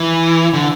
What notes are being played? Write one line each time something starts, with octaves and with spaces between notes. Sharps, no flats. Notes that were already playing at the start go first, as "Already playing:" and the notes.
Already playing: E3
D3